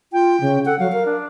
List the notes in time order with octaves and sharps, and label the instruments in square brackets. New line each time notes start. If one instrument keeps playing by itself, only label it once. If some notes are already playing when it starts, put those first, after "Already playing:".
[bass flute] F4 [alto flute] G5
[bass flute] C#3
[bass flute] A4 [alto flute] F#5
[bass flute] F#3 [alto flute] F5
[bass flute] A#4
[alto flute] D4